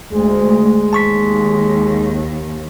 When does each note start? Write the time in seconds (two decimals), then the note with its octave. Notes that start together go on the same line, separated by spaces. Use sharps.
0.13 D2 G#3
0.93 D#2 A5 C#6 B6